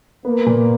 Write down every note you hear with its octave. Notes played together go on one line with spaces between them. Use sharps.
A#3 B3
A#2